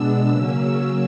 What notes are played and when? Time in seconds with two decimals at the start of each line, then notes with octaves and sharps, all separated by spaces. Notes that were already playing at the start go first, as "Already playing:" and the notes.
Already playing: B2 G#3 B3 D4 E6
0.27 C#3 F#3 A#3 C#4 E6